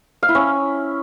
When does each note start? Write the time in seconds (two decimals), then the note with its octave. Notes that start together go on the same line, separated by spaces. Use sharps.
0.23 F5
0.29 E4
0.35 C#4